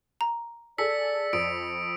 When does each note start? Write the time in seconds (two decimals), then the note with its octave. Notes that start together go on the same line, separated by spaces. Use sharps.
0.21 A#5
0.78 G#4 A4 D5 E6 B6 C#7
1.33 F2 D#6 D7